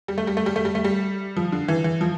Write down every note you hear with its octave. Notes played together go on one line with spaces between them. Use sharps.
G3
A3
G3
A3
G3
A3
G3
A3
G3
F3
D3
E3
E3
F3